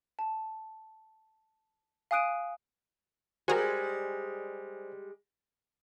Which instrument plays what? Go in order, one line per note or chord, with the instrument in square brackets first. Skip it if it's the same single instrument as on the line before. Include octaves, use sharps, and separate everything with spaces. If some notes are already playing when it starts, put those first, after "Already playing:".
[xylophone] A5
F5 G#5 D#6 F#6 D7 D#7
[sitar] G3 G#3 [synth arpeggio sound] F#4 G#4 A#4 [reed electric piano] C5 G#5